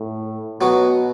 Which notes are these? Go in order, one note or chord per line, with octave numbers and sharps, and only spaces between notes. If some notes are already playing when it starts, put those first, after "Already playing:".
Already playing: A2
B2 F#3 B3 F#4